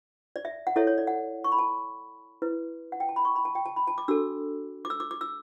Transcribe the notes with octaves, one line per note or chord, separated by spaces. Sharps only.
D5
E5
F#5
E4 A4 C#5 E5
C#5
D5
F#5
C#6
B5
A5
E4 B4
F#5
G5
A5
B5
C#6
B5
A5
G5
A5
B5
A5
D6
D4 F#4 A4 E6
D6
E6
D6
D6
E6